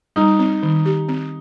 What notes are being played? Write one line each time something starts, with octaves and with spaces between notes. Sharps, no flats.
G3 D#4
C4
D#3
G4
C4